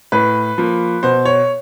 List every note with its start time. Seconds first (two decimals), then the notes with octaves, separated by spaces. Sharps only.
0.12 A2 B4
0.58 F3 A#3
1.03 B2 C5
1.25 C#5